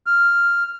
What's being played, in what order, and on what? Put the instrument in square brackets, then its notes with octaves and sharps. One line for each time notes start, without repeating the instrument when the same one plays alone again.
[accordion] F6